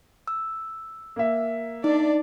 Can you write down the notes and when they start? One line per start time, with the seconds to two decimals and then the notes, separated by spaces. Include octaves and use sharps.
0.28 E6
1.16 A#3 E5
1.84 D4 D#4 D5